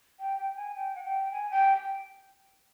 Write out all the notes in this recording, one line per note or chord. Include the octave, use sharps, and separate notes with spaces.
G5
G5
G#5
G5
F#5
G5
G#5
G5